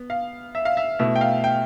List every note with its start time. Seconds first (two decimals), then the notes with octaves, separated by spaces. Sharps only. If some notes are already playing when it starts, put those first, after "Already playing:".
Already playing: B3
0.10 F5
0.55 E5
0.65 F5
0.77 E5
0.99 B2 A3 E4 E5
1.16 G5
1.21 F5
1.44 G5